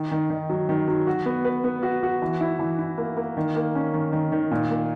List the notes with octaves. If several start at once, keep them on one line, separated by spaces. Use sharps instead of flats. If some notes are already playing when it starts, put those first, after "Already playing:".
Already playing: D#3
D#3
D#3
F#3
D#3
F#3
F#4
B3
B4
B3
F#4
F#4
E3
E4
E3
E4
A#3
A#3
D#3
A#3
C#4
D#3
D#3
D#3
A#2
A#3